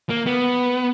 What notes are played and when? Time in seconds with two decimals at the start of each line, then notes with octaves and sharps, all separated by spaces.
0.09 A#3
0.26 B3